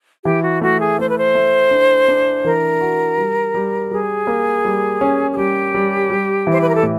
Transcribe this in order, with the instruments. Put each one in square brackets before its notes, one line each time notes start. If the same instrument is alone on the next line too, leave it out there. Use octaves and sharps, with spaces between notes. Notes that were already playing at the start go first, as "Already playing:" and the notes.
[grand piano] E3 [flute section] G4
[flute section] F#4
[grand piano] A3 [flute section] F#4
[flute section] G#4
[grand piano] A3 [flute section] C5
[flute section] B4
C5
[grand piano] A3
D4
D4
[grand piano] E3 [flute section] A#4
[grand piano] F#4
G3
G3
[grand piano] G3 [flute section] G#4
[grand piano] A#3
G3
C#4
[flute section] G#4
[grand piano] G3 [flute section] G4
[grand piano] G3
G3
E3
[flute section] C5
B4
A#4
A4
[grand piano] A2